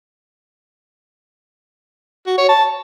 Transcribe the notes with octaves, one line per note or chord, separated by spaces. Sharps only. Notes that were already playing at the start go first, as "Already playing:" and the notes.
F#4
C#5
A5